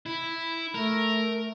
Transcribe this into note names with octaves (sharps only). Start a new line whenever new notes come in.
E4
A3 A#4